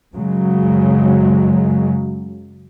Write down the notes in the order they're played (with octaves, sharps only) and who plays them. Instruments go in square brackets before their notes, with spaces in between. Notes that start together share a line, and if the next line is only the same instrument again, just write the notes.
[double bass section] F#2 C#3 F#3 G#3